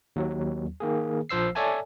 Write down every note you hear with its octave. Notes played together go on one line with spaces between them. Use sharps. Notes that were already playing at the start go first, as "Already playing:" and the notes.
D#2 F#3
D#3 A#3 G#4
A#1 F3 C5 E6 C7
A4 C#5 D5 E5 G#5 A5